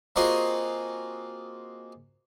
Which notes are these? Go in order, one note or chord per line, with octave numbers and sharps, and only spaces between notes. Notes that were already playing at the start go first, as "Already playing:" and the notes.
A#3 C4 F4 F#4 G#4 D#5